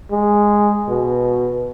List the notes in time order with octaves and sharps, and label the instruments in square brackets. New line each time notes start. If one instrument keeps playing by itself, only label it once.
[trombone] G#3
B2